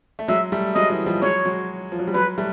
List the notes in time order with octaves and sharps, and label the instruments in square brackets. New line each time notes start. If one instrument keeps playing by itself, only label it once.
[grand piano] A3
[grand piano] F#3 G#3 [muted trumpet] E5
[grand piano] G3 A3
[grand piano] F#3 G#3 [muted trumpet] D#5
[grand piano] E3 F#3
F3 G3
[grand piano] F#3 G#3 [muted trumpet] C#5
[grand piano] F#3 G#3
F3
F#3
G3
[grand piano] F#3 G#3 [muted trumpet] B4
[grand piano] G3 A3